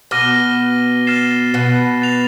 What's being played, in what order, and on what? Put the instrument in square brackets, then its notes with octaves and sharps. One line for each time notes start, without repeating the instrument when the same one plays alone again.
[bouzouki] B2 B3 [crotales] D6 F6 A#6 D#7 G7
[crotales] F6 A6 C7 E7
[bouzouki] B2 B3
[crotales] A6 C7 F7